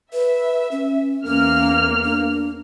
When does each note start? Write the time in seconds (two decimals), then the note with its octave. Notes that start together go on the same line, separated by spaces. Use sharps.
0.13 B4 E5
0.72 C#4
1.25 E2 A#3 C#4 F6
2.05 D4